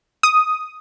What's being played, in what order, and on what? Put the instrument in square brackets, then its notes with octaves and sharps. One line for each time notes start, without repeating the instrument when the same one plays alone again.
[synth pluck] D#6